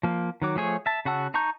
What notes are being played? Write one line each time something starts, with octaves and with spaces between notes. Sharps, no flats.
F3 A#3
D#3 F#3 D6
F3 A3 G#4 C#5
E5 A5
C#3 F#4 F#5 A5 E6
D#4 A5 A#5 C#6 G6